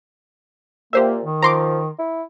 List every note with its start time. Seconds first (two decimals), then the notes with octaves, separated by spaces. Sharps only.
0.93 A#2 A#3 G4 C5 E5
1.24 D#3
1.42 F3 A#5 C6 D6
1.99 E4